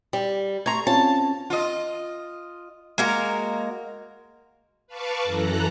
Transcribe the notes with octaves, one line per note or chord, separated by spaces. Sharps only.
G3
A3 A#5 C6 C#6 G#6
C4 C#4 F4 A5
F4 D#5
G#3 A#3 F#4 A#4
B4 F5 A5 C#6 D6
F#2 E3 A4 A#5 F#6